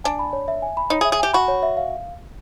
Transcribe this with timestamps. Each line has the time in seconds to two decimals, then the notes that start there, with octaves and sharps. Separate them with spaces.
0.04 D4 G#5
0.19 B5
0.33 C#5
0.48 E5
0.62 G#5
0.77 B5
0.90 D#4 C#5
1.01 G#4
1.05 E5
1.12 G#4
1.20 G4 G#5
1.34 F#4 B5
1.48 C#5
1.63 E5
1.77 F5